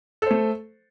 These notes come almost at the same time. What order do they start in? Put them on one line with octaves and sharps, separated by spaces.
A4 C5 A3